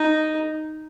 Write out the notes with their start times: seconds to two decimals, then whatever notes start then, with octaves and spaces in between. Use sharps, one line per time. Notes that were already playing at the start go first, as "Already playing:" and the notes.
Already playing: D#4